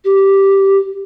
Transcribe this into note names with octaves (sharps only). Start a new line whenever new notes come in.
G4